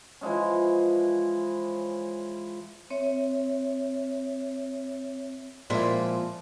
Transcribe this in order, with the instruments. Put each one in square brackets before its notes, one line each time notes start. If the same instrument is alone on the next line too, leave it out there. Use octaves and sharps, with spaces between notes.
[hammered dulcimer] E3 F3 G#3 C#4
[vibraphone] C4 C#5 E5
[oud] A#2 G#3 [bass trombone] F3 [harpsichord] C4 E4